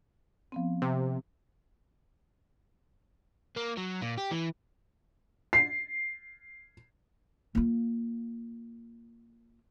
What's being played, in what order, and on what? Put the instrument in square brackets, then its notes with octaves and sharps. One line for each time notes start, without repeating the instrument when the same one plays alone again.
[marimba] F3 B3 C4
[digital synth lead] C3
[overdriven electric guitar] A#3
F#3
A#2
G4
E3
[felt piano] C7
[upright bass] A#3 F4